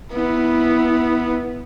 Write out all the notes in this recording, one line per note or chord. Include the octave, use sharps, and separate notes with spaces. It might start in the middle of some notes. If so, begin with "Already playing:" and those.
B3 E4